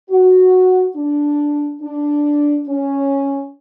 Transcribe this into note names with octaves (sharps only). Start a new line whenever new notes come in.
F#4
D4
D4
C#4